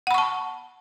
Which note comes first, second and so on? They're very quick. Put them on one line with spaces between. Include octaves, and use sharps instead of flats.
F#5 B5 C#6 A5